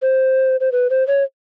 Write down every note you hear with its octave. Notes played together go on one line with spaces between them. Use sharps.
C5
C5
B4
C5
C#5